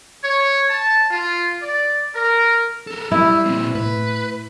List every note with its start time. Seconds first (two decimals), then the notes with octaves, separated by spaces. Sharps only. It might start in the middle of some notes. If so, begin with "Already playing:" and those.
0.24 C#5
0.69 A5
1.10 F4
1.62 D5
2.14 A#4
2.87 A4 A#4
3.11 G3 E4
3.45 A#2 C4
3.75 A2 B4